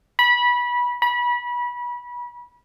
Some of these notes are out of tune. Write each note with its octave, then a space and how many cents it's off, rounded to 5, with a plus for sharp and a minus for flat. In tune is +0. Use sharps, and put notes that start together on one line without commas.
B5 -20
B5 -30